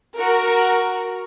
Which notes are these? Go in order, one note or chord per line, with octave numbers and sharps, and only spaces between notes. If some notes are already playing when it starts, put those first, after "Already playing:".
F#4 A#4